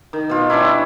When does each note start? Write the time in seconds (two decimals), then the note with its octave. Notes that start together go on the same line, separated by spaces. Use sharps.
0.13 D#3
0.29 B2 F4
0.50 G3 C#4 D4 E4